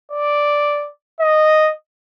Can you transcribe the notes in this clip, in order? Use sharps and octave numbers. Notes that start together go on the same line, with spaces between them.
D5
D#5